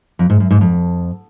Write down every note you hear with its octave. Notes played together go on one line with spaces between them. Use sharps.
F2
G#2
F#2
G#2
F2